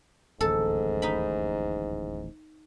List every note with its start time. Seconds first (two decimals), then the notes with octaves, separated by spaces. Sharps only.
0.41 D1 A1 D#2 G#2 A4
1.02 D#4 B5